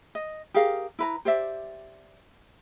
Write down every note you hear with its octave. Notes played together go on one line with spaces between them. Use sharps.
D#5
G4 G#4 A#4 F5
E4 B4 A#5
G4 C5 D5 E5